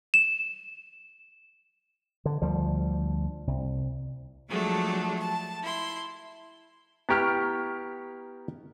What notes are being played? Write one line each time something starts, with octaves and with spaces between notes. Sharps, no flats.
E7
D3
D2 F3 G3
C2
F3 F#3 G#3 A3 D4
A5
E4 C6
B3 E4 G4 A#5 C#6 F6